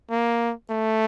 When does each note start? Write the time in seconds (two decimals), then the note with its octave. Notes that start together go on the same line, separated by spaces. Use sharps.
0.10 A#3
0.70 A3